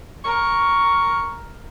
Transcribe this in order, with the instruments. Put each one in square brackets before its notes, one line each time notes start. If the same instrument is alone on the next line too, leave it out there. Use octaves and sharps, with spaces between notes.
[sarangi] A#4 [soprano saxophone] C#6